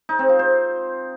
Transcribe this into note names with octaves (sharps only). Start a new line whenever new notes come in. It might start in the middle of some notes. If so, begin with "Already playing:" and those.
D#4
C4
F4
C5